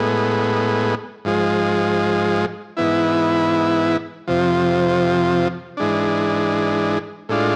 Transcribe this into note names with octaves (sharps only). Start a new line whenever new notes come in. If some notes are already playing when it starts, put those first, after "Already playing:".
Already playing: A2 G#3 B3
G#2 F3 G#3
G#2 E3 B3 E4
F2 C3 F3
G#2 E3 G#3 D4
A2 G#3 D4 F4